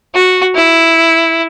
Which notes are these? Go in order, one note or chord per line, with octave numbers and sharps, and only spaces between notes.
F#4
E4